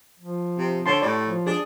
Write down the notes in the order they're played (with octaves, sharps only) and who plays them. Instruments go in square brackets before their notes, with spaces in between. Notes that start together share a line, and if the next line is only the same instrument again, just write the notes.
[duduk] F3
[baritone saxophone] C3
[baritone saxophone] D3 [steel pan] C#5 A5 C6
[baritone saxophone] A2 [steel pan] D5
[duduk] F3
[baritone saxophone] D4 [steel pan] G#4